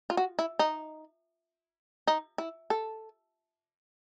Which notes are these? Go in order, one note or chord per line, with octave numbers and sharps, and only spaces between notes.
F4
F#4
E4
D#4
D#4
E4
A4